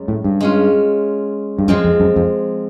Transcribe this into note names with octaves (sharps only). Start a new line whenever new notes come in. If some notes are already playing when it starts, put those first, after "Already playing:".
Already playing: F#2 G#3 C#4
A2
G2
G#3 C#4 F4
G2
F#2 F3 G#3 C4
F2
F#2
F2